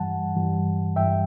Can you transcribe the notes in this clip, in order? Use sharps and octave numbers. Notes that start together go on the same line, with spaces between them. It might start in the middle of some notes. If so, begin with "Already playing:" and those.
Already playing: G2 E3 G3 F#5 A5
G2 E3 G3
G2 E3 G3 E5 G5